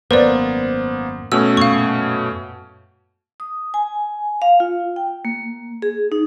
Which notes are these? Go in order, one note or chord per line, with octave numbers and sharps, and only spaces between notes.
G#1 F#2 A#3 B3 B4 C5 D5
B2 A3 C#4 E6
F#2 A#2 A#3 F5 C#6
D#6
G#5
F5
F4
G5
A#3
G#4
D#4